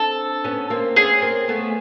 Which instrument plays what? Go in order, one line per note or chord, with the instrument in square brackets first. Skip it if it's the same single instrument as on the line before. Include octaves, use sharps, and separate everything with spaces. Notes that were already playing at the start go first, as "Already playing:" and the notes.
Already playing: [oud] C4 D4 [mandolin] A4
[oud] B3 C#4
A#3 C4
[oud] B3 C#4 [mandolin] G#4
[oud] A#3 C4
A3 B3